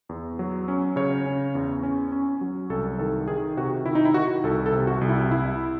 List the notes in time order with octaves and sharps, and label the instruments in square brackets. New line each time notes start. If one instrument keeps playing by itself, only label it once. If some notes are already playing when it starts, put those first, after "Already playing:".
[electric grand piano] E2
F#3
C#4
C#3 C#5
C#4
E2
C#4
C#4
F#3
C2 A4
D#3 A4
D#3 G#4
C3 F#4
D#3 E4
D#4
E4
D#3 F#4
C2 A4
A4
C3
F#4
C2
E4
C2 E4